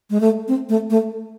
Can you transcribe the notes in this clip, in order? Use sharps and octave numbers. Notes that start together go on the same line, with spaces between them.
G#3
A3
C4
A3
A3